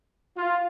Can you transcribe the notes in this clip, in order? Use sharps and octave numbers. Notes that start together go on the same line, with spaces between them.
F4